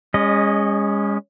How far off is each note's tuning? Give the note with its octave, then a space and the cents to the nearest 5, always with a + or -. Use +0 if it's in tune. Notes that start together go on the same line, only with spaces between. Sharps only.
G#3 -35 C#4 +0 D#5 +0